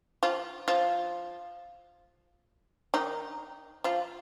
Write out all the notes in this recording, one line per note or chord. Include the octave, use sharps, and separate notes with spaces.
F3 F4
F3 F4
D#3 D#4
F3 F4